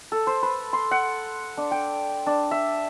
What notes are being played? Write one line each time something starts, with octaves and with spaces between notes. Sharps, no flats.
A4
C5
B4
C6
F#5
D4
G5
D4
E5